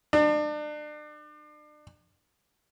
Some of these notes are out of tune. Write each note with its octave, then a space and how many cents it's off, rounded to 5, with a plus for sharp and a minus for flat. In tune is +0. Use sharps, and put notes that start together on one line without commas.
D4 +35